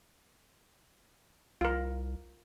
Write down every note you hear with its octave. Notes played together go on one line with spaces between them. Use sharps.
C2 F4 A#4